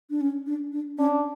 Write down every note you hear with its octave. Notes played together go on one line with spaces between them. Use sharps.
D4
C#4
D4
D4
C#4 D4